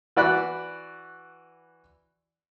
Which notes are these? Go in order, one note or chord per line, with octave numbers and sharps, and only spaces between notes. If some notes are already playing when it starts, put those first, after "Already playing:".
E3 F#4 D5 B5 F#6